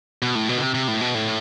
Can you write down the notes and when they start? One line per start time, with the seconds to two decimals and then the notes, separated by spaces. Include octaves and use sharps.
0.22 B2
0.35 A2
0.49 B2
0.58 D3
0.62 C3
0.74 C3
0.88 A2
1.01 B2
1.15 A2